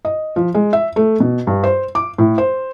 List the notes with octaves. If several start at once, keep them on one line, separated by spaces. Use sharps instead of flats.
D#5
F3
G#3
E5
A3
B2
G2
C5
D6
A2
C5